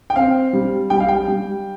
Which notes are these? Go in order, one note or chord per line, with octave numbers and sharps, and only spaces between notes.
G5
C4 F5
G3
G3 G5
F5
G5
G3